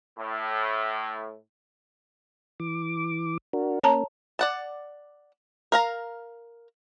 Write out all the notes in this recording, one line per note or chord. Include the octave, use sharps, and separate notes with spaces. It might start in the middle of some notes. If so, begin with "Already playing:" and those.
A2
E3 D6
D4 F#4 A#4
A#3 C#4 C#5 A5 A#5
D5 F#5 A5
A#4 F5 A#5